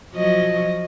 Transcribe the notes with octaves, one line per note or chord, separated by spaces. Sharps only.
F3 F#3 D#5